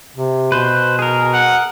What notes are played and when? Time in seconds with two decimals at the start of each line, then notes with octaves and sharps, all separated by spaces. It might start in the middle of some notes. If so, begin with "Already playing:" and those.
0.16 C3
0.52 B2 B4 C5
0.99 G#4 A#4
1.33 F#5